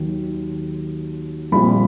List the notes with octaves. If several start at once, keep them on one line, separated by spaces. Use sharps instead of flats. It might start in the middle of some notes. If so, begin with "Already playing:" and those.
Already playing: D#2 D#3 F#3
A#1 A#2 G3 C4 B5